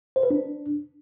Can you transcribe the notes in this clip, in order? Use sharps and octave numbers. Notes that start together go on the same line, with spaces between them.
C5
B4
D4